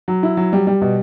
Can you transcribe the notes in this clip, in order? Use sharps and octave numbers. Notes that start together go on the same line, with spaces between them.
F#3
E4
F#3
G3
G3
B2